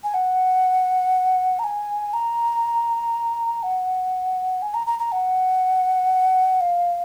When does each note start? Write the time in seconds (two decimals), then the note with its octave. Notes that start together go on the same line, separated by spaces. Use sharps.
0.04 G#5
0.14 F#5
1.59 A#5
1.64 G#5
2.14 A#5
3.63 F#5
4.62 G#5
4.74 A#5
4.87 A#5
4.99 A#5
5.12 F#5
6.61 F5